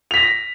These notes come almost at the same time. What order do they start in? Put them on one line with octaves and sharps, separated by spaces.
F7 B6 A#6